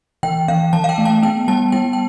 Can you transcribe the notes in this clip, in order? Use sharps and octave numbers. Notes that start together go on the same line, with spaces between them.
E3 G5
E3 F5
E3 A5
F5
G5
A3
A5
B3 G5
G3 A5
G3 G5
G5